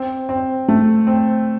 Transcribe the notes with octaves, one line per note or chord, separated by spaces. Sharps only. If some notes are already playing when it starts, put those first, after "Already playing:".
Already playing: C4
C4
A3
C4